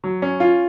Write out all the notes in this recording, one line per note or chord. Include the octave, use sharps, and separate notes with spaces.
F#3
C#4
F4